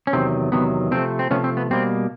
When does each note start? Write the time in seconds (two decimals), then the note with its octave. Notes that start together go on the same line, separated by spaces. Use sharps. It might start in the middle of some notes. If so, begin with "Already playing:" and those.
0.07 C#4
0.13 E2 C3 D#3 F#3 C4
0.52 E2 C3 D#3 F#3 B3
0.91 C3 F3 A3 C4
1.19 C4
1.31 C3 F3 A3 B3 C#4
1.44 C4
1.57 B3
1.71 B2 G3 A#3 C4